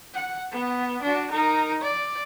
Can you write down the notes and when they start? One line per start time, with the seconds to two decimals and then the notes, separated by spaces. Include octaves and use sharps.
0.14 F#5
0.52 B3
1.02 D4 F#4
1.31 D#4 A#4
1.81 D5